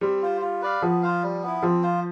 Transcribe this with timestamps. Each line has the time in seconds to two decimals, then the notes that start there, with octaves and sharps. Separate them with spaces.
0.01 G3 C4
0.22 F4 C5
0.41 F4
0.62 B4 D5 F5
0.82 F3 B3
1.03 F4 C5 F5
1.23 G3
1.43 B3 E4
1.62 F3 C4
1.83 F4 C5